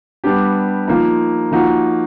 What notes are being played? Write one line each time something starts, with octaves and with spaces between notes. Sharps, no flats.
G3 B3 D4 G4
F3 A#3 D#4
F3 A#3 D#4 F#4